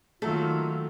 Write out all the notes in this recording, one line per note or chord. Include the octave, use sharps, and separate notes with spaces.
D#3 F#3 A3 A#3 F4 A4